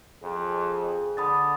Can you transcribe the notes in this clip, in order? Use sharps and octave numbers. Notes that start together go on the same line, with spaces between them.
F2 G#4
D3 B5 D#6 A6